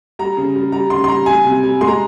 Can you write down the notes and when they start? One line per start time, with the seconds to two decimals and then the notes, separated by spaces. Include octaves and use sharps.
0.19 G3 A#5
0.37 C#3
0.56 G3
0.72 G3 A#5
0.90 C#3 C6
1.04 C6
1.08 G3 A#5
1.26 G3 G#5
1.45 C3
1.63 G3
1.81 G#3 C6
1.88 A#5